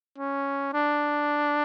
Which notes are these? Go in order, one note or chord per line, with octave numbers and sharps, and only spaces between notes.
C#4
D4